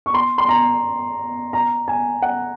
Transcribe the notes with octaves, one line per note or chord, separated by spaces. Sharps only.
C#6
C6
C6
A#5
A#5
G#5
F#5